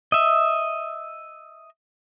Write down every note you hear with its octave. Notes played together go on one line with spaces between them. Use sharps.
D#5 E5